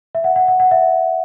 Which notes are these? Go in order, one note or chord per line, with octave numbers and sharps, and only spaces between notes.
E5
F#5
F#5
F#5
F#5
E5